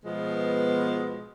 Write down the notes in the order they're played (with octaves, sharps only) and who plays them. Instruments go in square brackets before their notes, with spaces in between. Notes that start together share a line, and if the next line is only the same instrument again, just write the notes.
[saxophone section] B2 F3 G#3 B3